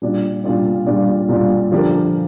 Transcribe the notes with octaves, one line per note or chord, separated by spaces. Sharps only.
A#2 G3 D4 F4 D5
A#2 G3 D4 F4 D5
A#2 G3 D4 F4 D5
A#2 G3 D4 F4 D5
D3 F3 D4 G4 A#4